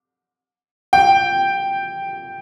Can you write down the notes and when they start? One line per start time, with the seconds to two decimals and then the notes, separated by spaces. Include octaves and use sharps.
0.93 G5